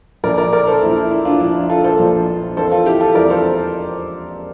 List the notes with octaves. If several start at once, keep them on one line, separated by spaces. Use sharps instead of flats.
A#1 A#2 F3 A#4 D5
A#4 D5
A#4 D5
A4 C5
A#1 A#2 F3 E4
E4
E4
D4 F4
A#1 A#2 F3 E4
D4
F4 A4
A4 C5
A#1 A#2 F3
F2 E3 A#3 A4 C5
F4 A4
E4 G4
F4 A4
F2 E3 A#3 A#4 D5
A4 C5